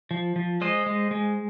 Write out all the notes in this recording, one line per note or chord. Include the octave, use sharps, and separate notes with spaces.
F3
F3
G#3 C5 D#5
G#3
G#3